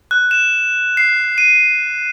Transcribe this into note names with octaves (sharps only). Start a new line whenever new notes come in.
F#6
E7
C7
D#7